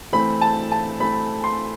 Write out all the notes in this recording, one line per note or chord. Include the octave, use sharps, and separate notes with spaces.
E3 A3 C4 B5
A5
A5
E3 A3 C4 B5
C6